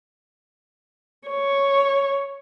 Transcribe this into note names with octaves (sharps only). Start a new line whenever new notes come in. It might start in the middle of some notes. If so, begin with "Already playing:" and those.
C#5